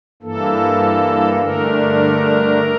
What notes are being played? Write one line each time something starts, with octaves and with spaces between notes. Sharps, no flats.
G2 E3 A#3 A4
G2 D3 A3 D4 A#4